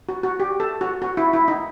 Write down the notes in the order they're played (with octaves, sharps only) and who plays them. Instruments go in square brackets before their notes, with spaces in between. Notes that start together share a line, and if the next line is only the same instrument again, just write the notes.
[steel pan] F#4
F#4
G4
A4
F#4
F#4
E4
E4
D#4